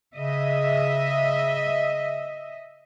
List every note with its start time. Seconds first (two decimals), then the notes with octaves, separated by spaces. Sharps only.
0.16 C#3 D#5 E5